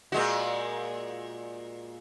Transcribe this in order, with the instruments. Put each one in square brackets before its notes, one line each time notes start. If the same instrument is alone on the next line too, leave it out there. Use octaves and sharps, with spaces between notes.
[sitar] A#2 G#3 F#4